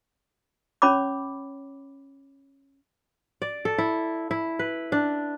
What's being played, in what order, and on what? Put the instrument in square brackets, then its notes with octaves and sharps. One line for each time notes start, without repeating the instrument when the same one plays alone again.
[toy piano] C#4 C#5 B5 D6
[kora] D5
A4
E4
E4
B4
D4